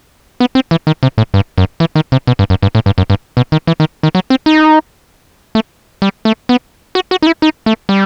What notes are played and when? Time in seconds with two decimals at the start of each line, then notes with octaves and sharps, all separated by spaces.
0.40 B3
0.55 C4
0.71 E3
0.87 D#3
1.03 C3
1.18 A2
1.34 G2
1.58 F#2
1.80 E3
1.96 D#3
2.12 C3
2.27 B2
2.39 G2
2.50 F#2
2.62 G2
2.75 A2
2.86 G2
2.98 F#2
3.10 G2
3.37 B2
3.52 D#3
3.67 E3
3.80 D#3
4.03 D#3
4.15 F#3
4.30 C4
4.46 D#4
5.55 A3
6.02 G3
6.25 A3
6.49 B3
6.95 F#4
7.11 F#4
7.22 D#4
7.27 E4
7.42 D#4
7.66 A3
7.89 G3